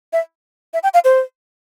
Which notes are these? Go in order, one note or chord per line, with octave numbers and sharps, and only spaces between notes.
E5
E5
G5
F5
C5